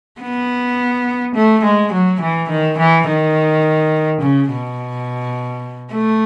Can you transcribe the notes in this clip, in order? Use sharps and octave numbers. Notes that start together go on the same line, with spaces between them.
B3
A3
G#3
F#3
E3
D#3
E3
D#3
C#3
B2
A3